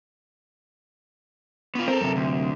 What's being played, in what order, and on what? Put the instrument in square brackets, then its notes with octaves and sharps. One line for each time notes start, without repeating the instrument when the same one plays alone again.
[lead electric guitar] B3 F4
[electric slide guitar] C4 [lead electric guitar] A4 A#4
[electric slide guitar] F#2 C3
[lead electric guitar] D2